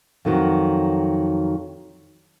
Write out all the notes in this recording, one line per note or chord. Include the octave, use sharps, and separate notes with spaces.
F2 D#3 F#3